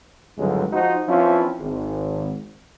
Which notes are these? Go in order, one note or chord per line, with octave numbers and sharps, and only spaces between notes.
G#1 C#2 G2 D3 F#3 G#3
F3 D#4 F#4 C5
E3 F3 C4 C#4 E4 F4
G#1